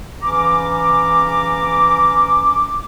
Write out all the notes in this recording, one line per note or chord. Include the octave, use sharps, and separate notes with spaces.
C#3 E3 C#4 A#5 D6